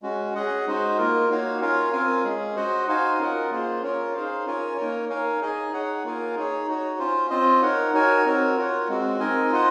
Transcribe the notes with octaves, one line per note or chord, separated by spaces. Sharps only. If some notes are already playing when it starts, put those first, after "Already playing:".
G#3 C#4 F#4
C#4 G#4 D#5 F#5
G#3 D#4 F#4 C5 D#5
A#3 F4 A#4
A#3 D#4 F#4 C#5 F5
C#4 F4 A#4 C#5 F5
C4 F4 A#4 F5 G#5
G#3 C#4 G#4
F#4 C5 D#5 F#5
D#4 F#4 C5 F5 G#5
C#4 F4 A#4 D#5 F#5
A#3 F4 G#4 C5
C#4 F4 A#4 C#5
D#4 G#4 C5 F5
C#4 F4 A#4 C#5 G#5
A#3 D#4 A#4 C#5
D#4 A#4 C#5 F5 G#5
D#4 G#4 D#5 G#5
D#4 G#4 C#5 F#5
A#3 F4 A#4 F5 G#5
D#4 G#4 C#5
D#4 F#4 C#5
C#4 F4 C5
C4 F4 C5 D#5
D#4 A#4 C#5 F#5
D#4 F#4 A#4 C#5 G#5
C4 F#4 A#4 C#5
F4 A#4 C#5 F#5
G#3 C4 F#4
C4 D#4 A#4 D#5 G#5
F4 C5 D#5 F#5